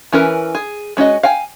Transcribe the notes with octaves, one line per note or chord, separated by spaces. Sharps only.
E3 C#4 A#4 B4
G#4
G#3 C#4 F#4 D#5
F5 G5 G#5